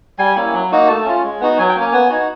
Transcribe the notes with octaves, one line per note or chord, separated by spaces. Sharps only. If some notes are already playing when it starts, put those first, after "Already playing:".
G3 G#5
A#3 C#4 E4
F#3
A#3 D#4 F#4
A3 A5
C#4 F4
G#3
B3 D#4 F#4
F#3 G#5
G5
A#3 C#4
G#5
B3 G#5
D#4 F#4